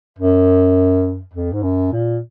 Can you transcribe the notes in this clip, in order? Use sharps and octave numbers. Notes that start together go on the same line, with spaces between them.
F#2
F2
G#2
F#2
A#2